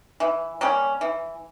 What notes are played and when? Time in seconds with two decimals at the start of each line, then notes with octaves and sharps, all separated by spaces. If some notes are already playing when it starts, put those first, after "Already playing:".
0.20 E3
0.61 G3 A#3 C#4
1.01 E3